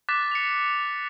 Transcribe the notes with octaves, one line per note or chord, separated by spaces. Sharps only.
D6 F#6 A6 B6
C#7 F7